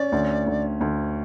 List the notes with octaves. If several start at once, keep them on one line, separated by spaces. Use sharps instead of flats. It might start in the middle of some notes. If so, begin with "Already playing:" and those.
Already playing: C#4 D5
D2
D2
D2